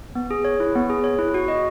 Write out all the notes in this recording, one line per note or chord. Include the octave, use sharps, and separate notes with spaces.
B3
G#4
C#5
E4
B3
G#4
C#5
E4
F#4
D#5